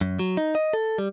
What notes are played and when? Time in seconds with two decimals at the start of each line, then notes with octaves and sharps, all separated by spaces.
0.01 F#2
0.19 F#3
0.37 D#4
0.55 D#5
0.73 A4
0.98 G3